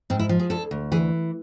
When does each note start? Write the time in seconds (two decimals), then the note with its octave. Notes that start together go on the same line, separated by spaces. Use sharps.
0.10 G#2 C4
0.19 E4
0.29 F3
0.40 G#4
0.50 D2 A4
0.71 D2
0.92 E3 G#4